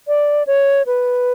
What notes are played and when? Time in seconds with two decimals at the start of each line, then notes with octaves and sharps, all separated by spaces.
0.08 D5
0.47 C#5
0.87 B4